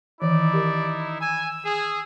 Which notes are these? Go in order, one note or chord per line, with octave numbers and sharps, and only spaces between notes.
D#3 E3 D#4 E4 D5
G4 A#4
G#5 E6
G#4